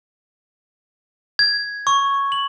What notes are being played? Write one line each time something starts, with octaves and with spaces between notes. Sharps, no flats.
G#6
C#6
F#7